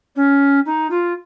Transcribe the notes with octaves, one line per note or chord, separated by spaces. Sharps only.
C#4
D#4
F4